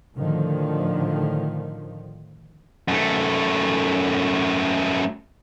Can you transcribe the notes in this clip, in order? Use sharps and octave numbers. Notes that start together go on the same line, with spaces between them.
A2 D3 D#3 F3
F#2 A3